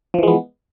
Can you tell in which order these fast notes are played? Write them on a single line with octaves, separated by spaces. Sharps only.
F3 E3 G#3 B3